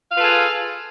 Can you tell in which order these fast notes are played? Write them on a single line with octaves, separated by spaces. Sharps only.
F5 B4 F4 A4 G#4